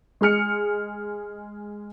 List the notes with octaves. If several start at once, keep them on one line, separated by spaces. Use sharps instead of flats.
G#3 G#4 F6 C#7